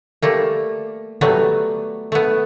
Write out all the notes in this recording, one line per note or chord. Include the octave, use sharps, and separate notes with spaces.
G3 A3 A#3
F#3 G3 A3 B3
A3 B3